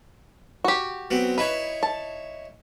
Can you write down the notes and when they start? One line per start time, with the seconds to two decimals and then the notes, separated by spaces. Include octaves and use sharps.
0.64 F#4 G4
1.10 F#3 B3 C4
1.38 D#4 E4 B4 C#5
1.83 A5